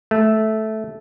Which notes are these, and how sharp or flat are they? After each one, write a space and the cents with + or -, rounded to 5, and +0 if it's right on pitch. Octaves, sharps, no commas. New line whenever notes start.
A3 -10